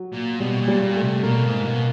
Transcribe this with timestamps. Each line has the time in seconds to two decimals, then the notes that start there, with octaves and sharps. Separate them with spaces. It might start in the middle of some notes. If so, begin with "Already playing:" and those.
Already playing: F#3
0.13 A#2
0.40 B2 G3
0.61 A#2
0.68 G3
0.81 A#2
0.96 A3
1.03 C3
1.23 B2 A#3
1.44 G#2
1.64 B2